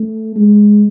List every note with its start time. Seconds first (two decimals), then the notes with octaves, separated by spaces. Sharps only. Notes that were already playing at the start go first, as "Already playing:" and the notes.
Already playing: A3
0.36 G#3